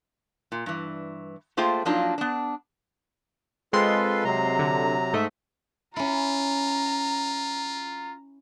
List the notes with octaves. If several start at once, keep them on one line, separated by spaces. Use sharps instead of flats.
A#2
G2 E3
A3 A#3 F4 G#4 C5 G5
F3 F#3 A#3 D4 D#4 F4
B3 D4
G#3 C4 F4 A4 B4 C6
C3 F#3 A#5
D3
G#2 A3 D#5 E5
C#4 E4 F4 A#5